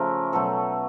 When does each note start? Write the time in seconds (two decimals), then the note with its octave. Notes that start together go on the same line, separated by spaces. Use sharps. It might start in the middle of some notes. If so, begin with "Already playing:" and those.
Already playing: C#3 F3 A3 A#4
0.33 B2 F#3 A3 A4